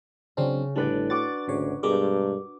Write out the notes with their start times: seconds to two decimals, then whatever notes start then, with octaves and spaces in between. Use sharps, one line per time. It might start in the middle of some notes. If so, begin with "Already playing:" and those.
0.37 C#3 F#3 C4 D4
0.76 A1 A2 D3 G3 D4 B4 D5
1.10 F#4 D6 A6
1.48 G#1 D2 C#3 C#5
1.83 G2 B2 G#3 A#4 D6